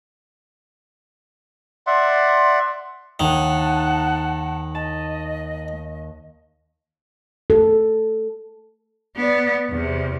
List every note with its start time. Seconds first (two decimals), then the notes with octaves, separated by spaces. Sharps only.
1.87 D5 E5 F#5 C6
3.20 D#2 D#3 F#5 A5
4.75 D#5 A5
7.50 A4
9.17 B3 D5
9.70 E2 C3